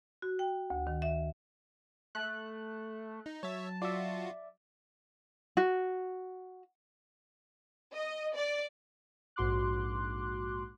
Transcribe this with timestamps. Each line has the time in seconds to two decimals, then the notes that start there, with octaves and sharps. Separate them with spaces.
0.22 F#4
0.39 G5
0.70 D2
0.87 D#3
1.02 E5
2.15 A3 F#6
3.26 D#4
3.43 F#3 C#5 E5 A5
3.82 F4 F#4 D5 E5
5.57 F#4
7.94 D#5
8.35 D5
9.36 A#1 G#2 F#4 C6 D6 F#6